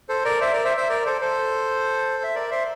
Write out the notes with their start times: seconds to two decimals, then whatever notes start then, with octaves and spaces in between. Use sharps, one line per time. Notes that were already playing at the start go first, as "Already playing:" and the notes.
0.09 A4 C5
0.24 A#4 D5
0.41 C5 E5
0.52 A#4 D5
0.65 C5 E5
0.77 C5 E5
0.89 A#4 D5
1.06 A4 C5
1.21 A4 C5
2.23 E5
2.35 A#4 D5
2.51 C5 E5